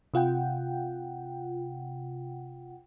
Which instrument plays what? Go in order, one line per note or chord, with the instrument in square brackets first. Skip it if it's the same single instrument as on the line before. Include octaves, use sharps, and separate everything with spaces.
[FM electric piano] C3 F4 F#5 G5